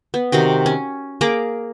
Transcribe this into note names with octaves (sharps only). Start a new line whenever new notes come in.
B3
C3 D#3 F#4 G5
C#4
A#3 G#4 A#5 D6